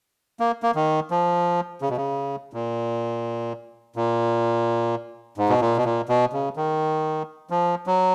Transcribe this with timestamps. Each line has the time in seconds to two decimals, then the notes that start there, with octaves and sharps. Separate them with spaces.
0.40 A#3
0.63 A#3
0.75 D#3
1.11 F3
1.82 C#3
1.89 B2
1.97 C#3
2.53 A#2
3.96 A#2
5.38 G#2
5.49 B2
5.61 A#2
5.77 B2
5.85 A#2
6.09 B2
6.33 C#3
6.56 D#3
7.50 F3
7.87 F#3